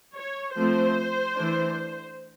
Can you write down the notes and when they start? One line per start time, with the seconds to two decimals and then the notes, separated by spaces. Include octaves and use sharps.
0.15 C#5
0.55 F3 A3 C4 C5
1.36 E3 A3 D4